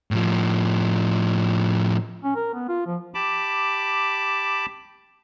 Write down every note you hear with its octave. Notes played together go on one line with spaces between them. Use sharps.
A2 F3
C#4
A#4
B3
F4
F3
G4 A5 B5 D6